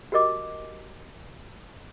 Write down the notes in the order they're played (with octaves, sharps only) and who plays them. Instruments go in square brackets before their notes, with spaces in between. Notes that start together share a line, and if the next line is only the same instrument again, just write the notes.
[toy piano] F#4 G4 A#4 D#5 D6